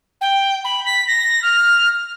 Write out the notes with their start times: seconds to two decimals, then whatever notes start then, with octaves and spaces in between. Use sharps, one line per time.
0.21 G5
0.64 B5
0.85 B6
1.07 A#6
1.42 F6